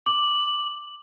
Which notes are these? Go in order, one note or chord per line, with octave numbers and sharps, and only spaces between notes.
D6 F#7